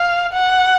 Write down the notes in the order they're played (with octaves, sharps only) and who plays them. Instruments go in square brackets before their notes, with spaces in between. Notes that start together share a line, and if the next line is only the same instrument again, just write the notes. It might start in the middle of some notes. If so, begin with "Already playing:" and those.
Already playing: [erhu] F5
F#5